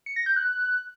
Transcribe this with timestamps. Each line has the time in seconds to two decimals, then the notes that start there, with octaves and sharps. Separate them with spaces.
0.06 C#7
0.16 A#6
0.26 G6
0.36 F#6